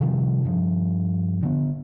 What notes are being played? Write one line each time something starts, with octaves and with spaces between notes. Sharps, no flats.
C3 D#3 F3 G3
G2 F3
D3 B3